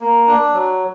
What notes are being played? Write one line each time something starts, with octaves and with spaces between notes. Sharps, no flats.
A#3
D4
F#3